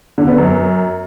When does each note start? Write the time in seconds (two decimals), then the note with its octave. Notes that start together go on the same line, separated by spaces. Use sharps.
0.18 D3
0.28 B3
0.38 F#2